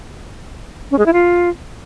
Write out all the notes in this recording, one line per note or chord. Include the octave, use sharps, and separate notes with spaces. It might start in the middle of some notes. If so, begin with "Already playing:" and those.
C#4
G#3
E4
F4